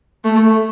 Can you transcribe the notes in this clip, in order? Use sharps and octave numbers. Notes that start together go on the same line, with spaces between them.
A3